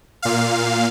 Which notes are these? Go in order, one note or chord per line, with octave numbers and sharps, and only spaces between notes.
A#2 F5